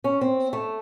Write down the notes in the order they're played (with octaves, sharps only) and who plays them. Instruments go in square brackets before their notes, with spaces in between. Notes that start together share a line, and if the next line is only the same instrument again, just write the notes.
[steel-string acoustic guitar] C#4
C4
A3